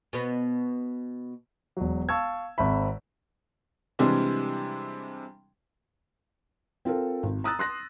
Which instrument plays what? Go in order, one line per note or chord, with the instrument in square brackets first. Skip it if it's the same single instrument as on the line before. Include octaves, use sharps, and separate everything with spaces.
[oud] B2 B3
[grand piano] E1 F#3
F5 A5 C#6 E6 G#6
G#1 C4 E5 B5
[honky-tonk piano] C3 E3 G3 G#3 D4 G#4
[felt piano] C4 F4 A4 A#4
G#1
A#5 D#6 E6 F#6 A6
C6 F#6 A#6